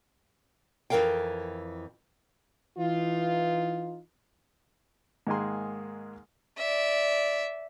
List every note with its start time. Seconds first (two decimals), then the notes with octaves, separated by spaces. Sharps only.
0.90 F2 E3 F3 A#4 F5 G5
2.77 E3 D#4 F4
5.27 G#2 D#3 G#3 A#3 G#4 C6
6.58 D5 E5